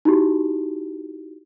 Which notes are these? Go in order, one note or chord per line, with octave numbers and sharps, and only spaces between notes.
D#4 E4 F#4 G4